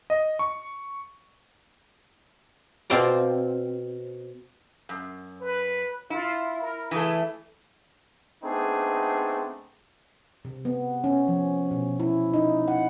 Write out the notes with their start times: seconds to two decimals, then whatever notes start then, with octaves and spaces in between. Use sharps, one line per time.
0.10 D#5
0.39 C#6
2.90 B2 C4 F4 C5 D5 A#5
4.89 F#2
5.41 B4
6.10 E4 F4
6.62 A#4
6.91 E3 A3 G#4
8.43 A3 B3 C4 D4 D#4 G#4
10.45 C3
10.65 B3
11.04 C#4
11.28 F3
11.71 B2
12.00 E4
12.34 D#4
12.68 F#5